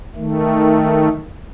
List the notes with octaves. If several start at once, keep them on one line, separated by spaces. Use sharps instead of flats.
D#3 A3